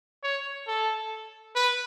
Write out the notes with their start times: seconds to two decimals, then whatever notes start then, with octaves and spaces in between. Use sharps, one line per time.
0.24 C#5
0.67 A4
1.56 B4